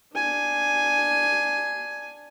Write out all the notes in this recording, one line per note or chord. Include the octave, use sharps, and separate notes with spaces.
D4 G#5